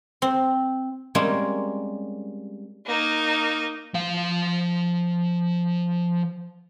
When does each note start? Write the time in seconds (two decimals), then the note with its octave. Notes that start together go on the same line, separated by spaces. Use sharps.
0.22 C4
1.15 G3 G#3 A#3 C4 C#4
2.86 A#3 D#4
3.94 F3 F5